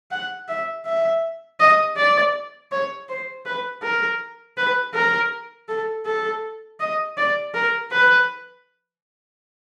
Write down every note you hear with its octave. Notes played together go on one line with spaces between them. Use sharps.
F#5
E5
E5
D#5
D5
C#5
C5
B4
A#4
B4
A#4
A4
A4
D#5
D5
A#4
B4